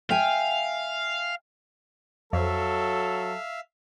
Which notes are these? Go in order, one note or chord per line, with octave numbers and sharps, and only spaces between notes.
E5 F5 G5 G#5
F2 F#3 A4 E5 F5